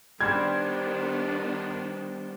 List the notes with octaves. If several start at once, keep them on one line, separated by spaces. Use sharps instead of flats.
D#3 G3 B3 D4 C5 D6 G#6